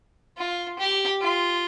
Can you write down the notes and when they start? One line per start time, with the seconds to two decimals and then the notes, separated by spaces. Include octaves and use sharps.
0.38 F4
0.79 G4
1.21 F4